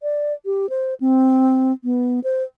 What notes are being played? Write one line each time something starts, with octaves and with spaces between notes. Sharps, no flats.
D5
G4
C5
C4
B3
C5